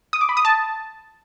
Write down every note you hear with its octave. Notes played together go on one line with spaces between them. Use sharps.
D#6
D6
B5
D#6
A5